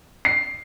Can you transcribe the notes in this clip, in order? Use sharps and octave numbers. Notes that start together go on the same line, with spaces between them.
C7